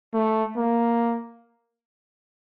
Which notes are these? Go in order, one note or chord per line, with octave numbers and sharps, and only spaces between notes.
A3
A#3